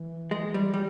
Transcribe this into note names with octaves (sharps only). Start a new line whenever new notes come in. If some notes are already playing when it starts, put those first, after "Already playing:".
Already playing: E3
G#3
G3
G3